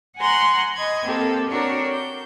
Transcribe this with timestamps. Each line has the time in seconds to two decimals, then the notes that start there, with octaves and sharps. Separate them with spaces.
0.18 F#5 G#5 A#5 C6 C#6 F#6
0.75 D#5 B5 G#6
1.05 A#3 C4 G4 A4
1.48 C4 D4 F#4 A#4 C#5
1.90 G6